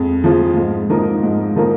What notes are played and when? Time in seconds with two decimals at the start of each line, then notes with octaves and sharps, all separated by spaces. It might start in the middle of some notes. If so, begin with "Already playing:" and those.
Already playing: F2 G#3
0.24 F3 G#3 F4
0.57 G#2
0.90 F3 A#3 D#4 A#4
1.23 G#2
1.56 F3 A#3 D#4 A#4